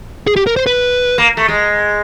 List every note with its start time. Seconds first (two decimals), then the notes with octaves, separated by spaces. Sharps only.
0.27 G#4
0.36 G4
0.47 A#4
0.56 C5
0.66 B4
1.18 A#3
1.37 A3
1.48 G#3